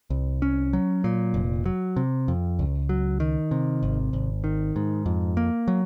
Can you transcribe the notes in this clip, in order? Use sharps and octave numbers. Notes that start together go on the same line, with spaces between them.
C2
C#4
F#3
A#2
F1
F#3
C3
F2
C#2
F#3
D#3
C3
G#1
G#1
D#3
G#2
F2
A#3
F#3